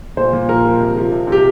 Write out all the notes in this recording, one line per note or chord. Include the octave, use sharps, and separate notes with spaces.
A#2 C5
A#2
F3 A#4
F3
C3
F3
C3
C3 G4